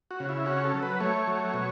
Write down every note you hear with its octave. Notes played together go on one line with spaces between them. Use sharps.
F#4
C#3
E4
C#4 F#4
A4
F#3
B4
A3 C#5
F#3
B2